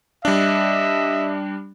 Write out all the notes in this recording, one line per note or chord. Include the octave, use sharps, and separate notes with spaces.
G3 D4 D#5 E5